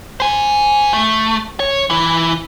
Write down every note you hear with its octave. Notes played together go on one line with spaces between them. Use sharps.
C5 G#5
A3
C#5
E3 E4